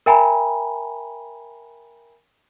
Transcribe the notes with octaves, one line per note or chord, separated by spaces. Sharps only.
A#4 E5 G5 G#5 A#5 B5